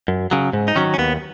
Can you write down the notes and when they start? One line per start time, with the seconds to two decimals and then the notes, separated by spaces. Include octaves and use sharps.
0.08 F#2
0.31 C#3 F#3
0.53 G#2
0.68 D#4
0.75 D#3 F#3 C#4
0.94 C#4
0.98 D#2 B3